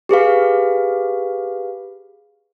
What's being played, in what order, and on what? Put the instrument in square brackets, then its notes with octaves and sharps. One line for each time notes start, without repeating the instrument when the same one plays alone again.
[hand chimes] G4 G#4 B4 F5